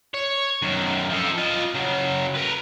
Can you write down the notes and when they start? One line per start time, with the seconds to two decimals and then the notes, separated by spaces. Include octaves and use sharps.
0.14 C#5
0.62 F#2 D#3
1.10 F3 A4
1.38 F4 D#5
1.74 C#3 F#3
2.35 A#4 B4